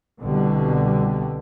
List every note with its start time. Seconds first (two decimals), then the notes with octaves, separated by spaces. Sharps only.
0.20 C2 B2 D3 G3